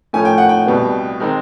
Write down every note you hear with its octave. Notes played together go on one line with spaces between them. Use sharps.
A2 F3 A3 C#4 G#5
G5
F#5
G5
C2 B2 G3 B3
D#3 G#3 C4 D#4